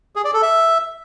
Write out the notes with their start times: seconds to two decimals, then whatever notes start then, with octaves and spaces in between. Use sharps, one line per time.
0.16 G#4
0.25 D5
0.33 A4
0.42 E5